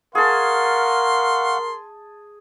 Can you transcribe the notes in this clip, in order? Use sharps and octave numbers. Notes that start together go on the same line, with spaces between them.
G#4 A#4 F5 F#5 A5 C6 C#6